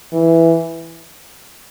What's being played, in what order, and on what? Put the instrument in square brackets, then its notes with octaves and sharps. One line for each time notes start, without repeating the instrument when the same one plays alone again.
[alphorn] E3